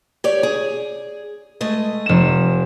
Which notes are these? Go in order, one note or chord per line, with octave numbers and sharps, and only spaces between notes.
G4 C#5 D5
G#4
G#3 A3 D#5
F1 E7